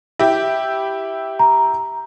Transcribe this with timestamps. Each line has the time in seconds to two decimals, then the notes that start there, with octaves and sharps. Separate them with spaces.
0.19 E4 G4
1.39 A#5